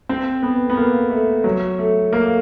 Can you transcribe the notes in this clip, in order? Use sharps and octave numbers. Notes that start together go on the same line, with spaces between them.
C4
B3
B3
A#3
A3
F#3
A3
A#3